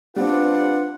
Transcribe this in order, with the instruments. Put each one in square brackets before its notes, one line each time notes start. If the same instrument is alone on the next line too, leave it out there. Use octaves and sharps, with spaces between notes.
[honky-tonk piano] G3 B3 C4 [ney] D4 [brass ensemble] F4 B4 F#5